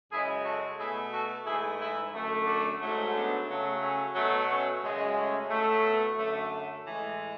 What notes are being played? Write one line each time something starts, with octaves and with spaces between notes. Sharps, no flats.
F#2 C#3 G#3 E4 G#4
F#4 A4
B2 A3 E4 G#4
F#4 A4
G#2 E3 A3 E4 G#4
E4 G#4
F#2 D3 A3
D4 F#4
G#2 F#3 A3
B3 D4
C#3 F#3 A3
A3 C#4
B2 F#3 A3
A3 C#4
F#2 C#3 G#3
A3 C#4
A2 F#3 A3
B3
F#2 D3 A3
A3
A2 E3 G#3